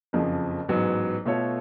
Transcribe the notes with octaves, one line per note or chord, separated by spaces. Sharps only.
F#1 F2 C#3 F3
A1 G#2 F#3 B3
B2 A3 F4 A4 C#5